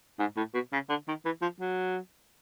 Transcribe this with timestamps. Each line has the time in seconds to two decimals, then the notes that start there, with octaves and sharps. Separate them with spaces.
0.20 G#2
0.37 A2
0.54 B2
0.73 C#3
0.89 D3
1.08 D#3
1.25 E3
1.42 F3
1.60 F#3